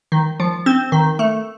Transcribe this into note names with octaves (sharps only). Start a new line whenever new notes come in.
D#3
F3
C4
D#3
A3